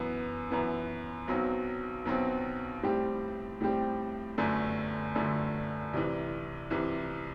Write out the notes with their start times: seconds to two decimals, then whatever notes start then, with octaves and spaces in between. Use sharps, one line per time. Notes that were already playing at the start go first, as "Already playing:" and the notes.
Already playing: F#2 E3 B3
0.50 F#2 E3 B3
1.28 B1 B2 F#3 C4
2.05 B1 B2 F#3 C4
2.83 A2 G3 C4 G4
3.61 A2 G3 C4 G4
4.38 G1 F#2 D3 A3
5.15 G1 F#2 D3 A3
5.93 C2 C3 E3
6.70 C2 C3 E3